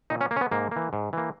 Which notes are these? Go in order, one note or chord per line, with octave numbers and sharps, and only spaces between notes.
A#2 D#4
C#4
A#3
C#4
B3
G#2 A#3
E3 A#3
G#2
E3 A#3